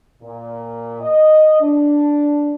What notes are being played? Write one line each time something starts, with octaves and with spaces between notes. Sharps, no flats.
A#2
D#5
D4